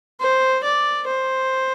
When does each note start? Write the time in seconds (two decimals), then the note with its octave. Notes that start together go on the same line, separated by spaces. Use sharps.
0.20 C5
0.63 D5
1.07 C5